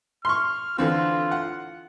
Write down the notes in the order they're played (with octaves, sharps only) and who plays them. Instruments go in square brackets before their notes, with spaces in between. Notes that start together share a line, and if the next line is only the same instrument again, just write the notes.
[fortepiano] C6 C#6 [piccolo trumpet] F6
[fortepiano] D3 E3 C4 [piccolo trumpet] F4
[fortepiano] F#5